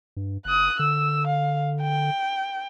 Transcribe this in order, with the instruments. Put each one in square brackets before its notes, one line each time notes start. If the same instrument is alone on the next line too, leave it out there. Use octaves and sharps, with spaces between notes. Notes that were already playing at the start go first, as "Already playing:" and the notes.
[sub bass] G2
[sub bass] F#1 [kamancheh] D#6 F#6
[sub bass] D3 [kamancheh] E6
[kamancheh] F5
G5